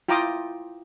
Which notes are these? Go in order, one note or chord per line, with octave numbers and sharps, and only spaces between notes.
E4 F4 G5 A#5 D6 D#6